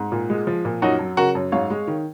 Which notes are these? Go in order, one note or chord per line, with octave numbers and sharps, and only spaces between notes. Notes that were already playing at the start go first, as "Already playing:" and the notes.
Already playing: G#2
A#2
G#3
F3
A#2
F#2 D#4 F#4
F#3
C#3 F#4 A#4
F#2
G#2 C#5 F5
G#3
D#3